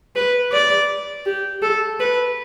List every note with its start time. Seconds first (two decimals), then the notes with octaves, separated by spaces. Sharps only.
0.16 B4
0.52 D5
1.26 G4
1.62 A4
2.00 B4